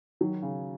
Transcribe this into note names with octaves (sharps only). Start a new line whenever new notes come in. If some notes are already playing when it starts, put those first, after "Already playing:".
D#3 F#3
C#3